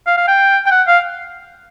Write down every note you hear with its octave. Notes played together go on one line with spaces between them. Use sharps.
F5
F5
G5
G5
F#5
F5